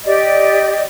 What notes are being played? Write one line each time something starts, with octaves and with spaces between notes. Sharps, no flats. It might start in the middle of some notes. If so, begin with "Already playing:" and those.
G4 D5 D#5